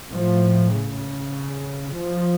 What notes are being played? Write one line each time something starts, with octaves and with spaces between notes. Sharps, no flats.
A2 F3
C#3
F3